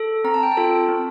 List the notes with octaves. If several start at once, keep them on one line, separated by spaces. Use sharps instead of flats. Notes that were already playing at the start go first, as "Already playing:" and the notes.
Already playing: A4
C4 A#5
A5
G5
A5
F4 A4
C4